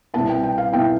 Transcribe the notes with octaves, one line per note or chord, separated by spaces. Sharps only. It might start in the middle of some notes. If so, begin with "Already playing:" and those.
C2 B2 B3 E4 A5
G5
G5
F5
B2 B3 E4 G5